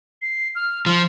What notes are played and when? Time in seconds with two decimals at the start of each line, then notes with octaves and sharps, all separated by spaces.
0.22 C7
0.55 F6
0.86 F3 F6